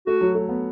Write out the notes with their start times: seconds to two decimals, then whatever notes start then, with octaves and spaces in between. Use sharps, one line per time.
0.07 A3 F#4
0.21 F#3
0.35 A3
0.49 B3